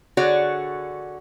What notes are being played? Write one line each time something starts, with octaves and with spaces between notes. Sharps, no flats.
D3 F#4 G#4 C#5 D5